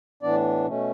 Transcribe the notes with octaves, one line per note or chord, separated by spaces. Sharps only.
A2 E3 B3 D4 D5
B2 A3 C#4